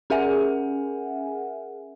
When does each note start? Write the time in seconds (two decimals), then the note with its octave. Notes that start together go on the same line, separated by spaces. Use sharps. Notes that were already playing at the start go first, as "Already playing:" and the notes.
0.10 C#4 G#4 A#4 E5 F#5 G#5